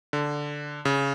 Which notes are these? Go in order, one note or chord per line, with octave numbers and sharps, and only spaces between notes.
D3
C#3